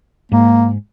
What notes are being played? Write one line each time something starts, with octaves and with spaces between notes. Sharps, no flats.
G#2 A#3